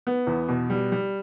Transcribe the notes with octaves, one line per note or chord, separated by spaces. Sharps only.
B3
E2
B2
G3
G3